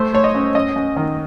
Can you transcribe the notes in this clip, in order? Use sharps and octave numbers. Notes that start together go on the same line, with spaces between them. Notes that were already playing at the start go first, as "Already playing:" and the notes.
Already playing: A3 C5
A3 C#5
D#5
F#2
F#2 D#5
F#2
D#3